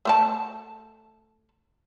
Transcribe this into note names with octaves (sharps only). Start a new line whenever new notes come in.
A3 C5 A5